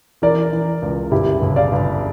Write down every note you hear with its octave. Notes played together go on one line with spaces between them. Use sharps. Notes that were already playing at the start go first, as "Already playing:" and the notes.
E3 A#4 D5
E3
C#2
G1 E4 G4
G1
D5 F5
G1